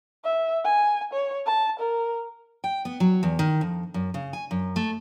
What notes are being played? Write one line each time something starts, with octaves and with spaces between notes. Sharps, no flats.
E5
G#5
C#5
A5
A#4
G5
B3
F#3
E2
D#3
F2
F#2
C#3
G#5
F#2
A3